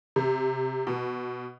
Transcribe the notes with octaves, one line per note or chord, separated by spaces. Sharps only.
C3
B2